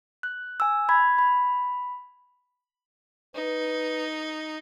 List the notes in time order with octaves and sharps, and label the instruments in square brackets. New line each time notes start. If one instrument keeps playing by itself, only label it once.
[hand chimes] F#6
G#5 E6
B5 G#6
B5
[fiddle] D#4 [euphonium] B4